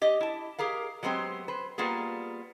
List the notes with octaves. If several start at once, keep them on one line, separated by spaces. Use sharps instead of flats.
G4 D#5
E4 A5
G4 G#4 A#4 F5
F#3 G#3 B3 C4 G4
B4 C5
G3 A#3 B3 F4 G#4